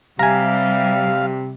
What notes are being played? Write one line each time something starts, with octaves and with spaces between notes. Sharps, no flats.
C3 G3 F5 G#5 A#5